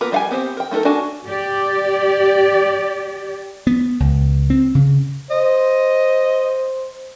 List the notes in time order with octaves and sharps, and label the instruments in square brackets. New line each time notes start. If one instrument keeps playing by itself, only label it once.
[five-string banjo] A#3 B3 F4 A#4 B4
G3 D5 F5 F#5 G#5
B3 C4 G4 C5
A#4 G5
A3 D#4 E4 A4 A#4
D4 F#4 A4 G#5
[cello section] G4 D5
[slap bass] B3
C#2
C4
C#3
[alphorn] C5 [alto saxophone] D#5